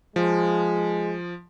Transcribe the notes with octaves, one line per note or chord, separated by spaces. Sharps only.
F3 G#3